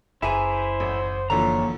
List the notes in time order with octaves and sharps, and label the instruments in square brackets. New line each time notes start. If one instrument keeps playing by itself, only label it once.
[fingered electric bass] F#1 [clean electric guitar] E4 G#5 [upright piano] G#4 E5 A#5 [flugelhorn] C5
[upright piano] A1
[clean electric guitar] A#2 A#5 [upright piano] D3 E3 F3 [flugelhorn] C#5